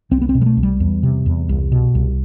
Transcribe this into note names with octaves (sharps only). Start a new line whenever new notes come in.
C2 C4
B3
C4
B2
G3
A3
C2
G3
E2
C3
E2
C2
B2
C2